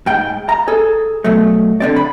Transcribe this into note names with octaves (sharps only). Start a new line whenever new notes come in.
G#2 G5
A#5
G#4 A4
B2 F#3 A3
D3 C4 D5
B5